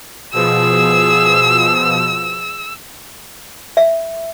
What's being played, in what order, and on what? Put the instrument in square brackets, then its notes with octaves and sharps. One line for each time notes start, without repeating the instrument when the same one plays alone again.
[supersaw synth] B2 F3 E7 [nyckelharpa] G#4 [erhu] E6
[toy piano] E5